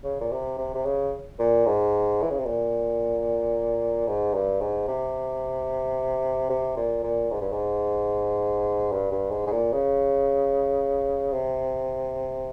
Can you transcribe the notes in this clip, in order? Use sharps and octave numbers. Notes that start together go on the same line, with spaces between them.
C#3
A#2
C3
C3
C3
C#3
A#2
G#2
E3
C#3
C3
A#2
G#2
G2
G#2
C3
C3
A#2
A#2
G#2
G2
G#2
G2
G2
G#2
G#2
A#2
C#3
C3